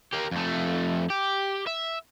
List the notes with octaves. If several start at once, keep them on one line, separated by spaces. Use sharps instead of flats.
A#3 G4
F2 A3
G4
E5